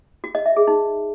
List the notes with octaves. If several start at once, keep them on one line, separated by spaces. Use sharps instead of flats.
F#4
D#5
E5
G#4
D#4